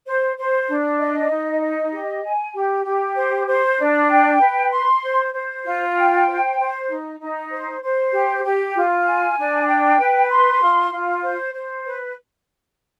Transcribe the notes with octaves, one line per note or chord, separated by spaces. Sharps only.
C5
C5
D4
D#5
D#4
D#5
G4
G#5
G4
G4
C5
C5
D4
G5
B4
C6
C5
C5
F4
G5
C5
C5
D#4
D#4
C5
C5
G4
G4
F4
G#5
D4
G5
B4
C6
F4
F4
C5
C5
B4